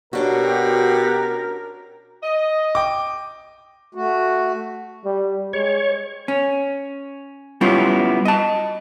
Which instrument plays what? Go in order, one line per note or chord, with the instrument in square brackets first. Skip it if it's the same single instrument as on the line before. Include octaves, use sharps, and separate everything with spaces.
[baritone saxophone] B2 [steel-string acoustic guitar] C#4 D4 F#4 [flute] G4 [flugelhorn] A#4
[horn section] D#5
[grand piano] G5 D6
[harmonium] A3 F#4
[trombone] G3
[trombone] G#3 [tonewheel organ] C#5
[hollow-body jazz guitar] C#4
G3 B3 C#4 E4 F4
D#5 A5